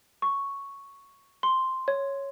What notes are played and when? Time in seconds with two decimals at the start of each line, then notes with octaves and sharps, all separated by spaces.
0.22 C#6
1.43 C6
1.88 C#5